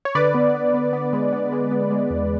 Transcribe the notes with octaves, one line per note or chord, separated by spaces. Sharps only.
C#5
D3 B4 D5
B3
B3
B3
B3
G#3
B3
G#3
B3
G#3
E2